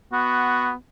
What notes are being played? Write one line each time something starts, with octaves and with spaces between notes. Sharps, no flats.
B3 F#4